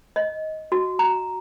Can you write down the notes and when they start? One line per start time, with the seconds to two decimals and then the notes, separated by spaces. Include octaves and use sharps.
0.16 D#5
0.72 F#4
0.99 A#5